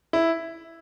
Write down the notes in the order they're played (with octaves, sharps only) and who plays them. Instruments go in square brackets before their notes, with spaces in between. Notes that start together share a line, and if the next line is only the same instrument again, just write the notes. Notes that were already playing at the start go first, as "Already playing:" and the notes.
[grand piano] E4